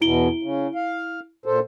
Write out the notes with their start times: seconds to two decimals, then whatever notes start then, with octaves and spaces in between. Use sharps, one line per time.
0.01 E2 B2 E4 D7 G7
0.43 C#3
0.75 F5
1.46 A#2 A4 C5